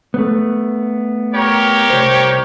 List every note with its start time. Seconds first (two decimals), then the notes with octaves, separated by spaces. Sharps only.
0.14 A3 B3
1.34 G4 A#4 C#5
1.90 C2 C5